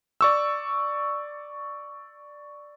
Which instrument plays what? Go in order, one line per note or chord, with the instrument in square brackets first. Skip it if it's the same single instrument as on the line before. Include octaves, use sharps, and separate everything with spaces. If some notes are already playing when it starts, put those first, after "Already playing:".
[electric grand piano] D5 C#6 E6